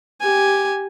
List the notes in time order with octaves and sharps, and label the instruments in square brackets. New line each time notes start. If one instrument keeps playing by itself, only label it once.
[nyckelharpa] G4 G#5